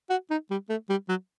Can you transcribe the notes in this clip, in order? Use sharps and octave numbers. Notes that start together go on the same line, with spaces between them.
F#4
D#4
G3
A3
G3
F#3